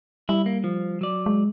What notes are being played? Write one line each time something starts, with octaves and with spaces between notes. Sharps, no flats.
G3 E4
A#3
F3
F#3 D5
G#3